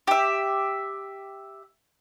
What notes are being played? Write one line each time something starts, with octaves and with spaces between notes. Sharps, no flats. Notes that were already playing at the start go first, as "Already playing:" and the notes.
G4 E5